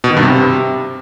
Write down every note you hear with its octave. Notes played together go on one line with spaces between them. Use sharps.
B2
D#3
G2
C3